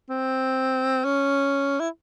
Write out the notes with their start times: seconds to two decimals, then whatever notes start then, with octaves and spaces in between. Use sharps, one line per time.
0.10 C4
1.04 C#4
1.80 E4